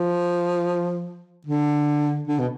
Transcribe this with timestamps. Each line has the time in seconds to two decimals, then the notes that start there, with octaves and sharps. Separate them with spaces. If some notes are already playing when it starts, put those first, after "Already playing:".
Already playing: F3
1.47 D3
2.27 D3
2.39 B2